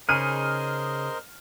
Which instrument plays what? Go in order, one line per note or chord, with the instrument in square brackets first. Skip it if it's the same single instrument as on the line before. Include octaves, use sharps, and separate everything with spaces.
[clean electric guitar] C#3 D#4 G#4 [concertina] A#4 C5 D#5 [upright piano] F6 D#7